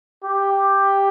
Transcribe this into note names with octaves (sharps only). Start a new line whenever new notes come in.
G4